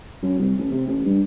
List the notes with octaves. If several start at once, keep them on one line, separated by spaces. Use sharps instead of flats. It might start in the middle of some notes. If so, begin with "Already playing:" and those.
F#2
C2
A1
C3
A1
G2